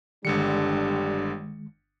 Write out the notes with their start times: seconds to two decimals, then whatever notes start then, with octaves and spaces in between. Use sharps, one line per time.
0.25 G1 D3 D#3 G3 G#3 D4 C#7